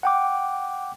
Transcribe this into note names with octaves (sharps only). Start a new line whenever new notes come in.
F#5 G5 D6